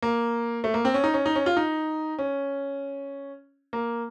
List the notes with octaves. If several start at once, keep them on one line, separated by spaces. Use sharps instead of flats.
A#3
A3
A#3
C4
C#4
D#4
C#4
D#4
C#4
F4
D#4
C#4
A#3